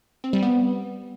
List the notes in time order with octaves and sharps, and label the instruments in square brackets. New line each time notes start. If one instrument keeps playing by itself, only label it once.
[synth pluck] C4
G3
B3